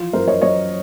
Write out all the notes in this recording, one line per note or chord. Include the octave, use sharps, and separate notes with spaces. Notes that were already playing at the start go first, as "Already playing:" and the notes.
Already playing: E3 F3 F4
F#2 A#4 C5
C#5 D#5
F#2 C#5 D#5